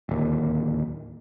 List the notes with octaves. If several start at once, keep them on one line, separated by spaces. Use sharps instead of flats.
D1 D#2